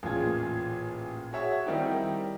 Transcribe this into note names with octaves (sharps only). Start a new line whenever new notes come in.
A1 A#2 F4 G#4 G#6
F#4 G#4 C#5 E5 F#5
D#3 G3 C4 D#4 E4 G4